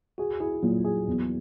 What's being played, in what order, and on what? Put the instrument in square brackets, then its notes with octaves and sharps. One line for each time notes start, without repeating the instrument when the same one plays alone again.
[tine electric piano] F#4 [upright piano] G#4
[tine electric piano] E4 [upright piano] G#4
[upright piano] A#2 [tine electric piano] F#3
[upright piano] G#4
E2